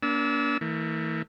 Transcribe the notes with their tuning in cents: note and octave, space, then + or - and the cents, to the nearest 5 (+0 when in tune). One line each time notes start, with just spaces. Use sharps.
A#3 +30 D4 -35 E6 -20
E3 -30 A3 +45